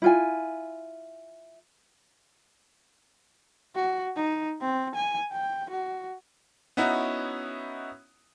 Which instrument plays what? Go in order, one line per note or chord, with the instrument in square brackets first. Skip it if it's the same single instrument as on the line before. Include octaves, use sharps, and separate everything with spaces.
[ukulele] E4 F4 G#5
[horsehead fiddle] F#4
D#4
C4
G#5
G5
F#4
[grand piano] B3 C#4 D#4 E4 F#4